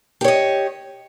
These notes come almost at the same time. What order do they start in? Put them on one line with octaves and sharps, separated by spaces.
G4 C#5 D#5